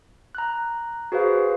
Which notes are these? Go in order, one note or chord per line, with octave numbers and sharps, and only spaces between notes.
A#5 F#6
F#4 G#4 B4 C5 F5